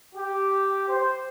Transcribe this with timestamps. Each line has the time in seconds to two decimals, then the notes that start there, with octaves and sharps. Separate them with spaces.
0.14 G4
0.88 C5